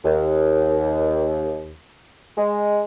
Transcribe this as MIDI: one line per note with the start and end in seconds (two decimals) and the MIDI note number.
0.05 1.70 39
2.38 2.81 56